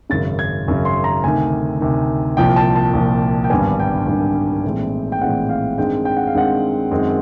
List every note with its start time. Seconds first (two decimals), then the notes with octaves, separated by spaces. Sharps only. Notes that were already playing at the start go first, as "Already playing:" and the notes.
0.10 G#1 F#2 C#3 A6
0.39 G#6
0.67 G#1 F#2 C#3
0.85 C6
1.04 A#5
1.24 D2 C3 D#3 G#5
1.81 D2 C3 D#3
2.37 C2 A#2 F3 G5
2.56 A5
2.76 A5
2.93 C2 A#2 F3
3.44 G5
3.50 G#1 G2 D3 G3 B3 G#5
3.80 G5
4.07 G#1 G2 D3 G3 B3
4.64 A#1 A2 E3 G#3 C4
5.12 G5
5.21 A#1 A2 E3 G#3 C4 F#5
5.49 F5
5.78 G2 D#3 G#3 C4 G5
6.05 G5
6.17 F#5
6.27 F5
6.34 G2 D#3 G#3 C4 F#5
6.91 F#2 D#3 G#3 C4